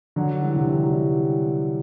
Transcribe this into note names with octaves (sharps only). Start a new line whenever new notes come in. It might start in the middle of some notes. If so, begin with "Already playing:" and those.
D3 F#3
E3 G3
C3
D3
E3
F#3
E3 G3